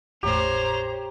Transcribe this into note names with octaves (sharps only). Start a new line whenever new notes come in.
G#1 E2 A2 G4 C5 C#5 A#5 F7